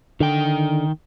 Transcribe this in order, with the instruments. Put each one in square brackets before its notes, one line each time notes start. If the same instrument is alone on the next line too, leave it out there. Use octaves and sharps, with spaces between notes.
[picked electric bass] D3 [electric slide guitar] D#3 G5